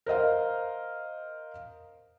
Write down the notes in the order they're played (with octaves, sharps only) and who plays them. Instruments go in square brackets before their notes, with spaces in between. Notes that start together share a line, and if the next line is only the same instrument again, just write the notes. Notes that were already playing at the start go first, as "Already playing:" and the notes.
[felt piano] A#4 C5 D#5 F5